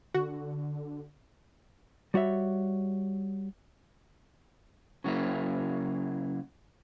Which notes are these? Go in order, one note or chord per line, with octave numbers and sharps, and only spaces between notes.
D3 F#4
G3 F#4 C#5 E5
C#3 F#3 A#3 E4